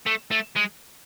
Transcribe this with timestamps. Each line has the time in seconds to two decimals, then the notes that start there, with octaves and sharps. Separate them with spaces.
0.06 A3
0.31 A3
0.56 G#3